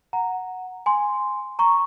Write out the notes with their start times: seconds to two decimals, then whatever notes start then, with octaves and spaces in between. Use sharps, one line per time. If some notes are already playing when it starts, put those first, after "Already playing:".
0.13 F#5 A#5
0.86 G#5 C6
1.59 A#5 C#6